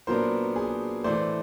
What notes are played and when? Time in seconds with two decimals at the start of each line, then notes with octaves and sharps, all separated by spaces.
0.07 A#2 F#3 B3 D4 A#4 C5
0.56 G#4
1.04 A2 E3 A3 C5 D5